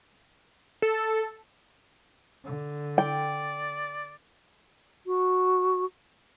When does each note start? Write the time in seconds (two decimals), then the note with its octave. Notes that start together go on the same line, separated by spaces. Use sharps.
0.82 A4
2.44 D3
2.98 D5 G5
5.06 F#4